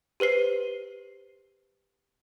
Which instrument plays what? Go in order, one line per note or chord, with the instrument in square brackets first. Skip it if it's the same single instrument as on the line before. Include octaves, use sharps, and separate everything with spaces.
[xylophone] G4 B4 C5 C7